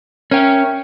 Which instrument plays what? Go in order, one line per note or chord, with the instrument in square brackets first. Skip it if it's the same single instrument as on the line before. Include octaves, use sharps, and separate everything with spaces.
[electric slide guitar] C#4 [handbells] A#4 C#5 E5 G5